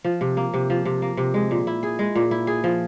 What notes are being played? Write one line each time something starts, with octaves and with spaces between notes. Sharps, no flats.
F3
C3
A#3
C3
F3
C3
A#3
C3
G#3
A#2
E4
G#4
G#3
A#2
E4
G#4
F3